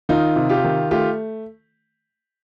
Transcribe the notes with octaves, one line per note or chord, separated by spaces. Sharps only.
D#3 D#4 F4
C3
F4 G4
D#3
A3 F4 G4